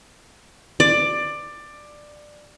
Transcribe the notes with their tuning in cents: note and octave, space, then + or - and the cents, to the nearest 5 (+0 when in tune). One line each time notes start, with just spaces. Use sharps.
D5 +15